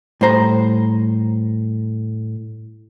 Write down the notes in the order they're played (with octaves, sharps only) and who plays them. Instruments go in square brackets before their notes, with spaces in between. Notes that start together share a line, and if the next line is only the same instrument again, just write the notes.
[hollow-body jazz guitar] A2 G3 C5 A#5